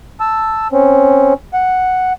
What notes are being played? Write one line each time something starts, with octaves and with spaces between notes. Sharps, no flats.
A5 E6
C4 C#4
F#5